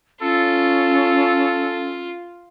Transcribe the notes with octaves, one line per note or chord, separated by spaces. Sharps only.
C#4 F4 A4